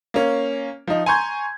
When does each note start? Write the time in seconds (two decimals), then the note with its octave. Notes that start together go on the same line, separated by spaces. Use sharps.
0.14 A#3 C#4
0.87 F3 D#4
1.06 G#5 A#5 C6 C#6 G6 G#6